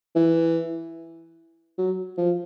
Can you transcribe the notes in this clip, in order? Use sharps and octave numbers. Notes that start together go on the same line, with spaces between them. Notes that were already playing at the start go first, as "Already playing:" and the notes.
E3
F#3
F3